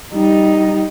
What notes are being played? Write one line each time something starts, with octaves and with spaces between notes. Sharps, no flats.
G3 D#4